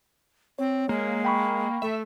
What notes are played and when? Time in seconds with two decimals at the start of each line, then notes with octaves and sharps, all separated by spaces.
0.59 C4 C#5
0.89 G#3 A#3
1.25 G5 B5 C#6
1.82 A3 E5